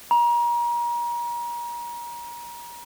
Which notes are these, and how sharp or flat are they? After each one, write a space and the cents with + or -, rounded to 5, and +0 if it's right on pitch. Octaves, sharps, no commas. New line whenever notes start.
A#5 +35